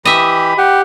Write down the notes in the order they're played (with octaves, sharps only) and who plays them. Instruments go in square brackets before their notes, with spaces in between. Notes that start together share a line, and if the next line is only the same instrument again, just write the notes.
[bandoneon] E3 G4 [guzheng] D#5 E5 [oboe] B5
[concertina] G4 [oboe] F#5